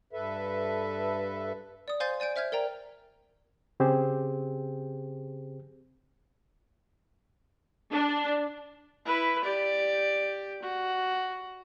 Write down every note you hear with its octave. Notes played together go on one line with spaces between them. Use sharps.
G2 A4 B4 E5
D5 D#6
C5 F5 G#5 C6 G6 A6
D5 G#5 G6 D7
C5 E5 F6 G6 G#6
A#4 D5 G5 A#5
C#3 C4 G4 G#4 C5
D4
E4 B4
G4 D5
F#4